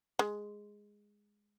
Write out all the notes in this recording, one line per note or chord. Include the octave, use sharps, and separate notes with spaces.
G#3